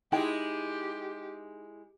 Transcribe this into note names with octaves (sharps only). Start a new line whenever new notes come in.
G#3 D#4 E4 G4 G5